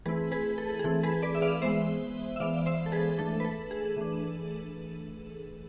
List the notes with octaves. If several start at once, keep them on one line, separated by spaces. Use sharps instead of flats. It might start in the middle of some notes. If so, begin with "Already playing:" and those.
E3 A3 C4 E4 G#4 B4
G#4 B4
A4
G#4
E3 A3 C4 E4 A4
G#4 B4
B4 D5
E5
D5 F5
E3 G#3 B3 C5 E5
E5
E3 G#3 B3 D5 F5
C5 E5
A4
G#4 B4
E3 A3 D4 A4
B4
A4
G#4
E3 A3 D4